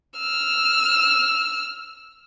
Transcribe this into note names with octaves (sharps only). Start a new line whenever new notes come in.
E6 F6